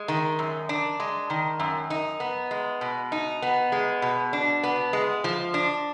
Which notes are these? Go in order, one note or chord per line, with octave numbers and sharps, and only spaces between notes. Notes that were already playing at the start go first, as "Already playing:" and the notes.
Already playing: G#3
D#3
F#2
D4
G#3
D#3
F#2
D#4
B3
G#3
B2
D#4
B3
G#3
B2
D4
B3
G#3
F3
D4